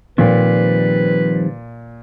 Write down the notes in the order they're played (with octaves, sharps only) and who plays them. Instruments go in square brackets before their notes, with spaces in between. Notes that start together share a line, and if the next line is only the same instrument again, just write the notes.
[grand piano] A#2 [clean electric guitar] D#3 G3 C4 [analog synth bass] F3 [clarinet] B4